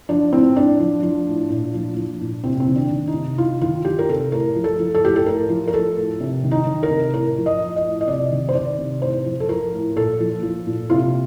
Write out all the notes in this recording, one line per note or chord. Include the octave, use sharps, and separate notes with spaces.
F3 D4
A2 C4
A2 D4
F3
F3
A2
A#2
F3
F3
A#2
C3 C4
C4
D#3
D4
D#3
D#4
C3
C3 F4
D#3 F4
D#3 G4
A#4
C3 A4
A2 A#4
F3
A4
F3
A4
A2 G4
A4
A2 A#4
F3
A#4
F3 A4
A2
C3
D#3
D#4
D#3
A#4
C3
A2 A#4
F3
D#5
F3
D#5
A2
D#5
C3 D5
D#3
C5
D#3 D5
C3
A2 C5
F3
A4
F3 A#4
A2
A#2 A4
F3
F3
A#2
C3 F4